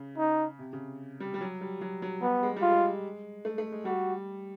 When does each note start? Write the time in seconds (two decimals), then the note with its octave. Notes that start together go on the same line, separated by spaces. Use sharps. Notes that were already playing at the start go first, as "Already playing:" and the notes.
Already playing: C#3
0.18 D#4
0.59 C3
0.73 C#3
1.20 G3
1.34 G3
1.41 F#3
1.61 G3
1.81 F#3
2.02 F#3
2.22 G3 B3
2.43 G#3
2.56 G3
2.62 F4
2.70 G#3
3.45 A3
3.58 A3
3.72 G#3
3.85 G3 F#4